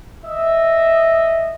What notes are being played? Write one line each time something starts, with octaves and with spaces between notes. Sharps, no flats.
D#5 E5